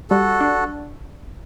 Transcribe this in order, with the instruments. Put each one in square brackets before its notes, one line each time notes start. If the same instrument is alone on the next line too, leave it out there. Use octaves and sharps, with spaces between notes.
[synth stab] G3 [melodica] F#4 A4
[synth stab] D4